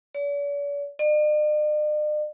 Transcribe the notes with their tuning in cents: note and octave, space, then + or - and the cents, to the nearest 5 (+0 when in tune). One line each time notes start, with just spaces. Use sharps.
D5 -45
D5 +45